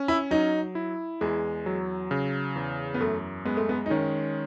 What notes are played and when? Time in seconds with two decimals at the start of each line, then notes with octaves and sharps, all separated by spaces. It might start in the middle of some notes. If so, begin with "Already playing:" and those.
Already playing: C#4
0.08 E4
0.31 F#3 D#4
0.75 E4
1.21 E2 G#3
1.66 F#3
2.11 C#3
2.55 E2
2.94 B3
3.00 F#2 A3
3.45 G#3 B3
3.57 A3
3.69 B3
3.86 D#4
3.90 D#3 C#4